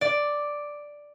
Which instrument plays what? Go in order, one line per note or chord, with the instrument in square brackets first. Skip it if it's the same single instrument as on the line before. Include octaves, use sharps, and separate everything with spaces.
[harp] D5